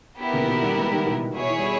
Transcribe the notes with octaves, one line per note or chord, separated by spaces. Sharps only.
B3 E4 G4 A#4
A#2 C#3
E3
B2 D#3
D#3 G3
E3 G#3
D#3 G3
B2 D#3
B2 E4 G#4 C#5
E3
G3